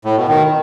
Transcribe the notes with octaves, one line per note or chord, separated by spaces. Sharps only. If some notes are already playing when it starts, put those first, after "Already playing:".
A2
B2
D#3